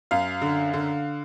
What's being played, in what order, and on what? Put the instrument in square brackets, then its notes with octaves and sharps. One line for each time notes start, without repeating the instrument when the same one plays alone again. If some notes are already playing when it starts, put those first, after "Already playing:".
[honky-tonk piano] F#2 F5
D3
D3